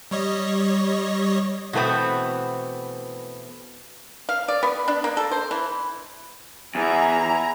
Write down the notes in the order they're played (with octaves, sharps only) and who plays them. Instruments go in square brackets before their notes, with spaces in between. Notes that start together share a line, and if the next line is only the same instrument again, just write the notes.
[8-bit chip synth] G3 C#5 D#5
[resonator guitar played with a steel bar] B2 E3 A3 B3 C4
[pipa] F5
D5
B3
D4
A#3
A4
C5
E3
[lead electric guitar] E2 [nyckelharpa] E4 [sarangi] G#5 [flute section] A#5